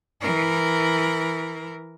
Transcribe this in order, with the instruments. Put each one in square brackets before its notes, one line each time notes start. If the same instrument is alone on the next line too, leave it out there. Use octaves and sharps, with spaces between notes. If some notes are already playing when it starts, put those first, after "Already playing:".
[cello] E3 A#4